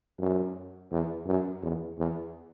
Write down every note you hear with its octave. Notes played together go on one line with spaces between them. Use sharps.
F#2
E2
F#2
E2
E2